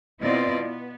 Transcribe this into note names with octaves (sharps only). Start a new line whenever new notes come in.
B2 C4 E4 F4 D5 D#5
B3